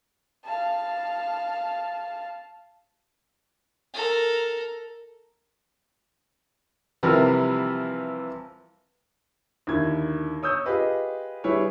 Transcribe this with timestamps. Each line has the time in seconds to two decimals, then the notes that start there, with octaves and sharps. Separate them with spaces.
0.45 F5 A5
3.94 A4 A#4
7.03 C3 E3 F3 G3 A#4
9.67 D#2 D3 E4 G#6
10.43 C#5 D#6 E6 G6
10.66 F4 G4 G#4 B4 D#5
11.44 G3 E4 G#4 B4 C#5